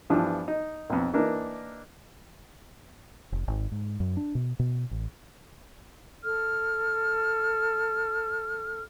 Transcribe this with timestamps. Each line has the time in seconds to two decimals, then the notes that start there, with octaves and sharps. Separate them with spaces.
0.10 G2 E3 F3 B3 D4
0.48 D#4
0.90 B1 F2
1.14 E3 A#3 D4 D#4 A#4
3.32 F1
3.48 G#1
3.72 G#2
4.00 F#2
4.17 D4
4.35 B2
4.59 B2
4.91 A1
6.24 A4 F6